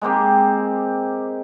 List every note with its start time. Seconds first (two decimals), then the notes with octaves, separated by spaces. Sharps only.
0.02 G#3 A#3 C4 G4